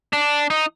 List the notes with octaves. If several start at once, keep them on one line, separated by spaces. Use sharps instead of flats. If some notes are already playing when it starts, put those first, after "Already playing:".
D4
D#4